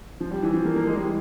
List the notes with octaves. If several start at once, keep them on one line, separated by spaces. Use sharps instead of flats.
F3
G3
E3
F3
A#3
A#3
G#3
G3
E3